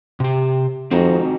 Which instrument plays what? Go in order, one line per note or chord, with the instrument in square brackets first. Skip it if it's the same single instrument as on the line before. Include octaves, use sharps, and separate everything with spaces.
[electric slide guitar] C3 G4
[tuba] F2 [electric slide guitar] C4 D#4 F#4